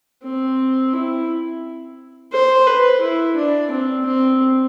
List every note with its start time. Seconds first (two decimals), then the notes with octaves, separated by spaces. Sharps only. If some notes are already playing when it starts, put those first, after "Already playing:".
0.24 C4
0.93 E4
2.33 C5
2.67 B4
3.02 E4
3.36 D4
3.71 C4
4.06 C4